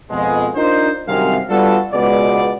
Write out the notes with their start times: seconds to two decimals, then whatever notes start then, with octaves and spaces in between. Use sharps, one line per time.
0.11 F2 B2 G#3
0.55 D4 D#4 F4 A#4 C5
1.07 C2 F#2 C3 D#3 G#3 F5
1.49 G3 B3 D4 F4 F#4 A4
1.93 C#2 B2 G#3 B3 D5